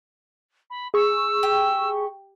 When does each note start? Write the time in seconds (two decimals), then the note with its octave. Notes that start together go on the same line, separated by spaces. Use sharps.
0.70 B5
0.94 G#4 C#6 E6
1.43 G4